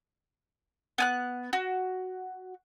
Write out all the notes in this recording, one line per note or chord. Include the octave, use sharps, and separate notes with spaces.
B3 G#5 F#6
F#4